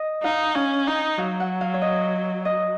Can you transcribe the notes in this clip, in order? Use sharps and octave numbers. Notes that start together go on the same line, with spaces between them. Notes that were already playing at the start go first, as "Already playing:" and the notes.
Already playing: D#5
D#4 F5
C#4 F5
D#4
F#3 F5
F#5
F5
C#5
D#5
D#5